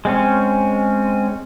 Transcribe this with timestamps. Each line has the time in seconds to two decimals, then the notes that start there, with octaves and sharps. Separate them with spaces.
0.05 G#3 C4 C#4